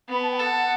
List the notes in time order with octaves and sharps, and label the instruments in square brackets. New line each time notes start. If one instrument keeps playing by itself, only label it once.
[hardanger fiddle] B3 [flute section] B5
[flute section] A5
G5
[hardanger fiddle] A4 [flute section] F#5